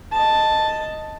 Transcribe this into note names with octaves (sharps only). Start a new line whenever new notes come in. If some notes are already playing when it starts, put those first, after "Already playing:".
D#5 A5